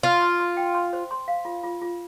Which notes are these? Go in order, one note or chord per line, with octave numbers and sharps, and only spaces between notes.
F4 C6
C6
C6
G5
C6
C5
C6
F5
F4
F4
F4